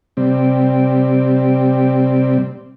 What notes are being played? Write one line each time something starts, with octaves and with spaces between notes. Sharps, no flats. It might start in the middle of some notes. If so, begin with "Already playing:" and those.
C3 G3 C4